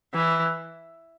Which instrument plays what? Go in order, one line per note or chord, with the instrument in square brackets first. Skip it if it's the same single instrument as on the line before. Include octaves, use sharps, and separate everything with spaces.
[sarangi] E3